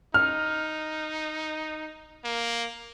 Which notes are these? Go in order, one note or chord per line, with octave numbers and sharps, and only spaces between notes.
D#4 F6
A#3